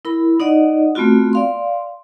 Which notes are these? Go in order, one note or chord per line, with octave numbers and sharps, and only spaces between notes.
E4 A#4 B5
D#4 D5 D#5 F#5
A3 B3 C4 F4 F#4
D5 F5 C6